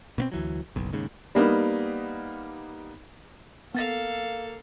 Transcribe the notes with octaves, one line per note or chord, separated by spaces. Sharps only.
B2 B3 C4
D2 E3 F#3
F#1 B1
D#2 G#2 C#3
G3 A#3 B3 D#4
A#3 B3 A4 F5 A6 A#6